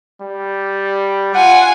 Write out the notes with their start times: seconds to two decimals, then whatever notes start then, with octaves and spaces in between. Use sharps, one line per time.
0.22 G3
1.35 F4 F#5 G#5